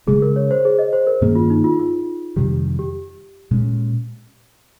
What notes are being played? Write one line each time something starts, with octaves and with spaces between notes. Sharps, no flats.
C#3 G#3 C#4 G#4
A#4
C#5
C5
G#4
D#5
C5
A#4
G2 D#3 A#3 C#4 G#4
F4
D#4
F4
F4
F2 C3 D#3 G3 G4
G4
A#2 G#3 C#4